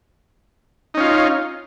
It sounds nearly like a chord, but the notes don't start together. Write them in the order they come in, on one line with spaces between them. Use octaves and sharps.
D#4 C#4 F4